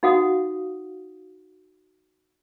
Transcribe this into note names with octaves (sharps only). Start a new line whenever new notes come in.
D#4 F#4 F5 F#5 D#6